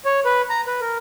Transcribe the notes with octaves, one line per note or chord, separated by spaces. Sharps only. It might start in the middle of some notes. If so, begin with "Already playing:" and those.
C#5
B4
A#5
B4
A#4